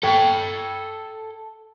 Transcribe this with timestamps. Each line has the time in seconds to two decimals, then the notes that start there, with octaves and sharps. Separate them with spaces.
0.03 A4 G5